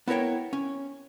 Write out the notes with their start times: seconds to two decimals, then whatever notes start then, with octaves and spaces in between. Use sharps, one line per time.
0.08 B3 E4 A#4 C#5 G5
0.53 C#4